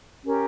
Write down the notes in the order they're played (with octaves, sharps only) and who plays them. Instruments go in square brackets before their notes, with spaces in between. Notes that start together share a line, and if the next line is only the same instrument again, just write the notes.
[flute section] C#4 G4 A#4